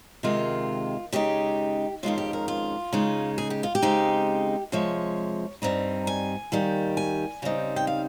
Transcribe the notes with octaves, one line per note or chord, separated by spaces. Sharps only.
C3 D#3 G#3 F4
C#3 G#3 D#4 G4
F2 D#3 G#3 C#4 F4
G4
A#4
F4
C#3 G#3 D#4
G#4
G4
F4
G4
C#3 G#3 C4 D#4
C3 F3 G#3 C#5
G2 G3 C4 D#4 A#5
G#5
D#2 D#3 G3
G#5
C#3 G3 C4 D#4
G5
F5